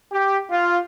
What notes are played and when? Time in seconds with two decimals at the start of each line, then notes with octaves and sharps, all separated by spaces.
0.12 G4
0.50 F4